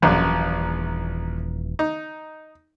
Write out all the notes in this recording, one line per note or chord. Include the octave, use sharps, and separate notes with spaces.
D#1 A#1 F#2 E3
D#4